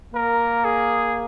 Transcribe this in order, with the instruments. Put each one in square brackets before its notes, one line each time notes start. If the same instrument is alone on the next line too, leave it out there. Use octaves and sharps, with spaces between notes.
[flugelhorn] A#3 [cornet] A#4
[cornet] G#4